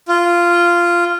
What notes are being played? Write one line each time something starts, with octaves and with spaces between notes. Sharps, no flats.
F4